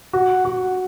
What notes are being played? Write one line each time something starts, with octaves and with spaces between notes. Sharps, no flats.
F#4
F#4